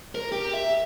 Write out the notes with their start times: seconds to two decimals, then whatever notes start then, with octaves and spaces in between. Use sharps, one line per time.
0.15 A#4
0.32 G4
0.54 E5